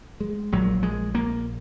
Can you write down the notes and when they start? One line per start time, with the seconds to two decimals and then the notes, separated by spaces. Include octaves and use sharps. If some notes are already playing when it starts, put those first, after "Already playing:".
0.20 G#3
0.52 A#1 A#2 F#3
0.83 G#3
1.15 A#3